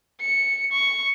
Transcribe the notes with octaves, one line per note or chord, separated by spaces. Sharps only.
C#7
C#6